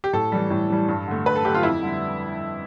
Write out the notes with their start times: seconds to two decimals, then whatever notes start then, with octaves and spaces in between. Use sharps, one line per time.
0.04 G4
0.13 A2 A4
0.32 E3 G3
0.50 A2
0.70 E3 G3
0.88 G2
1.07 D3 A3
1.26 G2 B4
1.36 A4
1.45 D3 A3 G4
1.54 F4
1.63 F2 E4
1.83 D3 G3